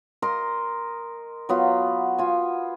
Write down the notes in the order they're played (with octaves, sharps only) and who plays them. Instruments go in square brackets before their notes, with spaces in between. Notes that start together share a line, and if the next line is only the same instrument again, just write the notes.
[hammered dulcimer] A#4 D#5 C6
F#3 B3 F4
F4 G#5